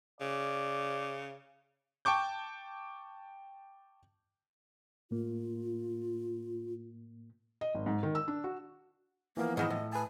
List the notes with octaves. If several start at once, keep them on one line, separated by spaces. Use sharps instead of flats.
C#3 D5
G5 A5 C#6 D6 G6
A2 A#3 F4
D#5
G#1
G#2
D#3
E6
D4
F#4
E3 F3 A#3 B3
G#2 D#3 E4 D#5
A2
B4 G#5 A5